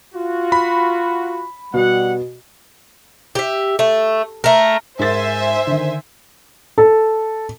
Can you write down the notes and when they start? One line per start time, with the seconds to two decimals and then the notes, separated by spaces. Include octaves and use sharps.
0.14 F4 F#4
0.52 B5
1.74 B2 G3 F#5
3.35 G4 E5
3.79 A3
4.44 A3 A#4
4.99 G#2 A#4 C5 E5 G#5 A6
5.67 D3 D#3
6.78 A4